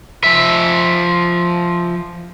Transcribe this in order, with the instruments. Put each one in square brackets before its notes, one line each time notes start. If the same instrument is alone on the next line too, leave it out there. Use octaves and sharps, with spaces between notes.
[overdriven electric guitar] F3 E5